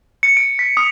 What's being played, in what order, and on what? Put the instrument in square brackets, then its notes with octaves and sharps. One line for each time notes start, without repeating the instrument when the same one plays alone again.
[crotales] C#7
D7
B6
D#6